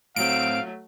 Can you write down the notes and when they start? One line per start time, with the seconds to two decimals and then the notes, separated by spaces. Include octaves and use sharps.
0.16 A2 F#3 A3 C4 F5 D7